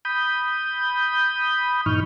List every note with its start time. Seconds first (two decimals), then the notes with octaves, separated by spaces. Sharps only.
0.05 B5 D#6 G6
1.86 G2 A#2 E3 D#4 C#6 F6